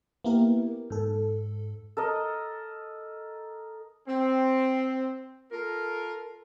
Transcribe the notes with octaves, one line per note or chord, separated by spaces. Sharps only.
A#3 B3 E4 G4 A#4
G#2 A4
A4 A#4 D#5
C4
F4 A4 A#4